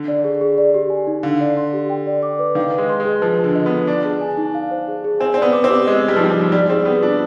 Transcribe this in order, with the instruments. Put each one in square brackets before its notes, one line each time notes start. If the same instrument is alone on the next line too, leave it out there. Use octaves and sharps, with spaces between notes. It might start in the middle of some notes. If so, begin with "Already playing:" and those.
Already playing: [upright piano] D3
[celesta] D5
G#4
G#4
D5
G4
G#5
D#4
[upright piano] D3 [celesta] F5
[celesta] D5
C6
G4
G5
D5
D6
B4
[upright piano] D#3 [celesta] F5
[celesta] B4
[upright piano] G#3
[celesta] C6
[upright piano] G#3
[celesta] G#4
[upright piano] F3 [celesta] B4
[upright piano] D3 [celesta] G#4
[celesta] D#5
[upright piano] B3
[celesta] F4
[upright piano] D4 [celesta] D5
[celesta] G#4
G#5
D#4
F5
C5
G#4
G#4
[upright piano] C4 [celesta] G#5
[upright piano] C4 [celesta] D5
[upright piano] B3
[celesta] D6
[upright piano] C4
[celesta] G4
[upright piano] G#3 [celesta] D#5
[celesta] B4
[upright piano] G3
F3
[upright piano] G3 [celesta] D#4
[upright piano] F3
[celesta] D#4
[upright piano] G3 [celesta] D5
[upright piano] C4 [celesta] G#4
[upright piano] B3 [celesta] G5
[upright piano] D4 [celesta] F4